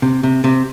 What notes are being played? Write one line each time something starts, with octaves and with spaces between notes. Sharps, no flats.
C3
C3
C3